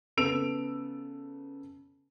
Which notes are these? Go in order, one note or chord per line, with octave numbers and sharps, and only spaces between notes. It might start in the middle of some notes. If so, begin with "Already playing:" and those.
C#3 B3 A4 E6 D7 F7